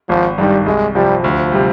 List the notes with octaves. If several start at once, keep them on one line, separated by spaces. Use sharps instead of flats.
G#1 F3
G2 D#3 G3
C2 G#3
C3 F3 G3
D2 F3
C3 G3